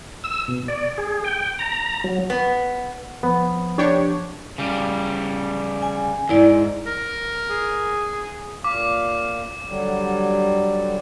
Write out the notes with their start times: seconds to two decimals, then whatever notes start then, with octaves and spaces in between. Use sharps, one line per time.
0.24 E6
0.48 B2
0.68 D5
0.98 G#4
1.24 G5
1.59 A#5
2.04 F#3
2.30 B3
3.23 F3 B3
3.78 D4 G4 C#5
4.58 C#3 G3
5.82 G#5
6.29 D#2 G#2 E4 D5
6.87 A#4
7.50 G#4
8.64 A#2 F5 D6
9.67 D3 F#3 G3